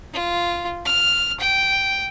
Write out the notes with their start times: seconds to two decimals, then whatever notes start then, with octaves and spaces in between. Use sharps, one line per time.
0.14 F4
0.85 F6
1.40 G5